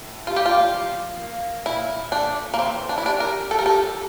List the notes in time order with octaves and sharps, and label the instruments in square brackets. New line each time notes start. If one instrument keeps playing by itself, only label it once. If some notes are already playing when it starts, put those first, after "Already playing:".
Already playing: [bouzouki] A2
[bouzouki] G3 [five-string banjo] F4
[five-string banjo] G4
F4
[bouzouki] F3
A#3
[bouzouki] A#2 [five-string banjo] E4
[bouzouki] A3 [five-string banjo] D4
[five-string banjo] A#3
[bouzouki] E3 [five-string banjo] C4
[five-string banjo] D4
E4
[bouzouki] G3 [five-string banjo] D4
[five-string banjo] A#4
[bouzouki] G4 [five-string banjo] A4
[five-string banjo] A#4
A4